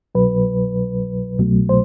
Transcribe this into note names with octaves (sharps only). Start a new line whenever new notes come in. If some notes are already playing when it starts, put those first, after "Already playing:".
C2 B2 F#3 B4
C2 B2 F#3 A3
C5